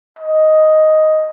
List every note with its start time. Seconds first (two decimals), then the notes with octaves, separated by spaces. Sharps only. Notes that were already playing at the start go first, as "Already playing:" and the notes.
0.19 D#5